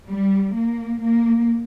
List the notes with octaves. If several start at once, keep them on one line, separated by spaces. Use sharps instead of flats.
G3
A#3
A#3